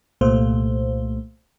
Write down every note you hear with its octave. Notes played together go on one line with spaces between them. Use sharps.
C2 A#2 A3 C5